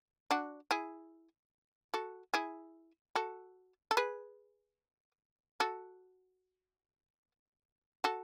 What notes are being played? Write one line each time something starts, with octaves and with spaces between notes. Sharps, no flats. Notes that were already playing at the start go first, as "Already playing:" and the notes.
D4 F#4
E4 G#4
F#4 A4
E4 G#4
F#4 A4
A4
G#4 B4
F#4 A4
F#4 A4